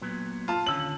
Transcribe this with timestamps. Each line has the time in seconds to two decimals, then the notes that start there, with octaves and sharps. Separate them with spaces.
0.02 A#2 F#3 B3
0.48 F4 A5
0.67 D#2 D3 C#4 E6 F#7